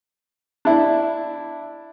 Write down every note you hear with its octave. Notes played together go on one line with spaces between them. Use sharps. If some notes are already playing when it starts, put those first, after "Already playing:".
D4 E4